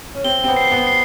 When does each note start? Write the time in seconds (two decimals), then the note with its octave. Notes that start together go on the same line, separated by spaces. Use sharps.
0.15 C#4
0.24 C4 G7
0.44 C4
0.48 B3
0.57 C7
0.72 B3
0.87 C7